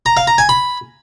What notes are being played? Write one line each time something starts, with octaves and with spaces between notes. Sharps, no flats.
A#5
F5
A#5
G#5
B5